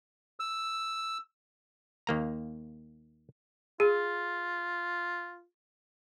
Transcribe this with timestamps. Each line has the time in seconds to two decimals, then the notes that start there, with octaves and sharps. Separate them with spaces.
0.40 E6
2.07 D#2 A#3 A#5
3.80 F4 G#4